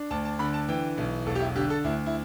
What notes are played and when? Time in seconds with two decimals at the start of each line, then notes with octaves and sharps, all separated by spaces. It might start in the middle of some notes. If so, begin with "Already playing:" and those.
Already playing: D4
0.10 D2 A5
0.25 A5
0.39 D3 B5
0.54 A5
0.69 E3 G5
0.97 B1
1.26 E1 A4
1.35 G4
1.41 E4
1.55 D3 G4
1.70 A4
1.84 D2 E4
2.06 E4